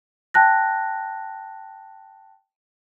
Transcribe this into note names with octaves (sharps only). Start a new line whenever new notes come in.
G5 A5 F#6 A#6